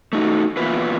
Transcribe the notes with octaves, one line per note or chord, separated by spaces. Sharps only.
A3 D#4 F#4
E3 A#3 B3 E4 F4 B4